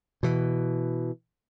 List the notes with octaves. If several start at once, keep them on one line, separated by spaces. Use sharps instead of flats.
B2 E3